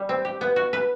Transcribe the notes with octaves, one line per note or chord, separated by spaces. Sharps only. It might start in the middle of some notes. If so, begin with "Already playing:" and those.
Already playing: G3
C4
G4
B3
F#4
B4